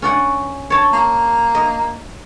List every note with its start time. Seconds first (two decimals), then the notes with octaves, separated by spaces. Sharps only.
0.02 C#4 D5 F#5
0.70 C#5 A5
0.93 A#3
1.55 D#5